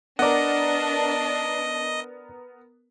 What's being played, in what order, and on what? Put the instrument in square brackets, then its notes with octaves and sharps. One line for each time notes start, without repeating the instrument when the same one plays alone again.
[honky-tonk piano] B3 A#4 [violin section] D4 [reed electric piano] D5 F#5 [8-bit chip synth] D#5